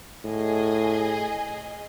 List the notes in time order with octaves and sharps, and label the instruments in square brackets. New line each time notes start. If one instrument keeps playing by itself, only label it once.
[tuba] A2 [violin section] G#4 D#5